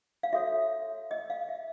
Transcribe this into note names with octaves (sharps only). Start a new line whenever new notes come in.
F5
F#4 A4 C#5 E5
D#5
F5
E5